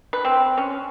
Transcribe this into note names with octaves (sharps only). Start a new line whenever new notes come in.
B4
C4
C#4